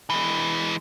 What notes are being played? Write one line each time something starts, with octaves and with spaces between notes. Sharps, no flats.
E3 G#3